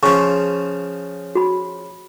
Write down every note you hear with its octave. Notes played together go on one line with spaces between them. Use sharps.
C#3 F3 C#6
F#4 B5